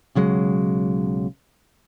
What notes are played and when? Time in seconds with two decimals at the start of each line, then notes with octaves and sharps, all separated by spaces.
0.15 B1 C#3 F#3 G#3